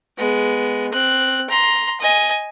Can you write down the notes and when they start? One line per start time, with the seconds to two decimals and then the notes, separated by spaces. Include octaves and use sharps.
0.17 G#3 B3
0.92 C4 F#6
1.49 A#5 C6
2.00 D#5 G#5